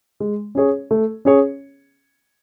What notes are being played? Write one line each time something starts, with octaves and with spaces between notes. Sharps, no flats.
G#3
C#4 G#4 C#5
A3
C#4 G#4 C#5